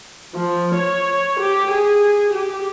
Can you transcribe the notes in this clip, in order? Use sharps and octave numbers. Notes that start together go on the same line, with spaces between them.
F3
C#5
G4
G#4
G4